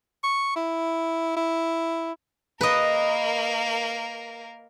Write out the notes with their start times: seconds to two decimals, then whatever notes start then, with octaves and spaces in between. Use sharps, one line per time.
0.24 C#6
0.56 E4
1.36 E4
2.61 A#3 A#4 B4 D#5